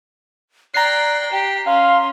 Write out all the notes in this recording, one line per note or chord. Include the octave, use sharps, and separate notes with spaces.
D5 G5 A#5 F#6 C7
G4 G5
C#4 F5 C6